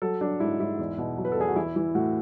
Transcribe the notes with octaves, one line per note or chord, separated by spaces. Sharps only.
F#3 A4
F#3 D4
G#2 E4
G#2 E4
E2
B2
F#3
B4
A4
E2 G#4
F#4
E3 E4
E3
A2 F#4